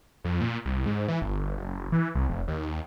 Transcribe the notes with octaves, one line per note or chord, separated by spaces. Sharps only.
F2
A#2
C2
G#2
E3
G1
F#1
E3
C2
F1
D#2